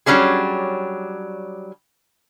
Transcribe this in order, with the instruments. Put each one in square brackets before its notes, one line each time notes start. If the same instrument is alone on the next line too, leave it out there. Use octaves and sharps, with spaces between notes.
[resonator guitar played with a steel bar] F#3 G3 C#4 D4 G#4